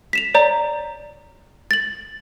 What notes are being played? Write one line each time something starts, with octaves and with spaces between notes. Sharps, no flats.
B6 E7 F7
C#5 D5 A#5
A6 F#7